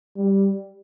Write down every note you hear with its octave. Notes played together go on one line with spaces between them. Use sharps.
G3